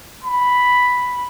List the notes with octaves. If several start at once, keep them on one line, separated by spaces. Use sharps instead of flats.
B5